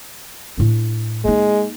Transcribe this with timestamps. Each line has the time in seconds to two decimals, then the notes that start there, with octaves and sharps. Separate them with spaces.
0.57 A2 D4
1.24 G#3 A#3 D#4